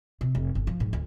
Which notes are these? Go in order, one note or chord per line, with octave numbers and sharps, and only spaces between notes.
C3
F1
G1
F3
G#2
D2